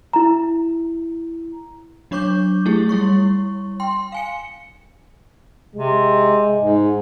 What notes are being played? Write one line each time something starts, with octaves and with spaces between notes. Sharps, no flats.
E4 A#5
F#3 D4 C#5 C#6 D6 G6
A3 E4 G4 G#4
G3 E4 C#5 C#6
G5 C6
F5 G#5 C#7
C3 G#3
G#2